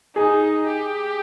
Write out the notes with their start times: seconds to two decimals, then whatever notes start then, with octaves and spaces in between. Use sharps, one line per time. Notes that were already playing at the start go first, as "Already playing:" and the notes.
0.15 D#4 G#4
0.67 G4